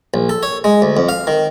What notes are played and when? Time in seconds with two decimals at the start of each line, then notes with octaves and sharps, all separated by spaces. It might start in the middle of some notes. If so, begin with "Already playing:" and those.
0.14 A#1
0.29 A4
0.43 C#5
0.64 G#3
0.82 D2
0.97 F2
1.09 F5
1.27 D#3